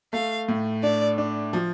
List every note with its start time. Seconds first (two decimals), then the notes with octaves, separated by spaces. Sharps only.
0.13 A3 F5
0.48 A2
0.83 D4 D5
1.18 D4
1.53 F3